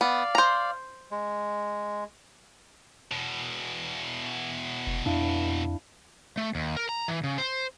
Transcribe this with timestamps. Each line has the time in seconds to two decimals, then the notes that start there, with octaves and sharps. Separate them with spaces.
0.01 B3 D5 F5
0.35 C5 A#5
1.11 G#3
3.11 E2 B2
4.87 F1
5.06 F2 D4 E4 F5
6.37 A3
6.55 D#2
6.76 A#4
6.89 A#5
7.08 E3
7.24 C#3
7.38 C5